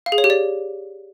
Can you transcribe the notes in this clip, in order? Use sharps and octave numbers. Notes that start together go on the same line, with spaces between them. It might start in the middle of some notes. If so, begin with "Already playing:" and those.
F5
G#4
C#5
G4
D5